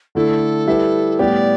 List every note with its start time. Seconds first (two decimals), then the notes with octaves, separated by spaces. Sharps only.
0.15 D3 A3 E4 A4
0.67 G3 E4 G4 B4 E5
1.19 A2 G3 B3 G4 D5